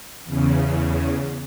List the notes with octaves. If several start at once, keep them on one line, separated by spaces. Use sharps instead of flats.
E2 C#3